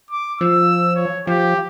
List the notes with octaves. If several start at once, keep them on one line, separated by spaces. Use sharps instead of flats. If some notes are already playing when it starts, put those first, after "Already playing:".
D6
F3 E6
C#5
F3 G4